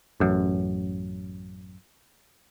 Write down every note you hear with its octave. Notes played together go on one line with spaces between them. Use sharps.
A1 F#2